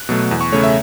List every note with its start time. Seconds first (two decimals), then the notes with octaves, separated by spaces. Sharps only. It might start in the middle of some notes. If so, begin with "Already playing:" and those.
Already playing: F#6
0.09 B2 F#3 A3
0.31 E2
0.41 C#6
0.52 C#3 A3 C#5
0.63 E5